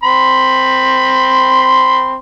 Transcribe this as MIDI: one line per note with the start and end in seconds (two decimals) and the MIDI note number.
0.03 2.19 60
0.03 2.19 83
0.03 2.19 84